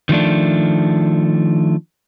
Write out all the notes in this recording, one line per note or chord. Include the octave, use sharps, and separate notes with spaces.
D#3 F3 A3 D4